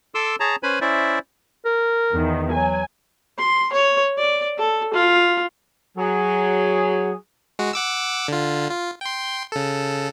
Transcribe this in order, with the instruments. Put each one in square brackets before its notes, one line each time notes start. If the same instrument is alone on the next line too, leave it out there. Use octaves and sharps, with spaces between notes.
[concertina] A4 C6 D6 E6
G#4 C#5 A5 A#5
C#4 B4 C5 G#5 B5
C#4 E4 C5 D5 E5
[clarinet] A#4
[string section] E2 D#3
[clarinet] F#3 [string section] G#5
[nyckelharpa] C6
C#5
D5
A4
F4
[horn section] F#3 G#4
[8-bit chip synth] G#3 F#4
F#5 D6 E6
D3 F4
F4
G5 C6
C#3 A4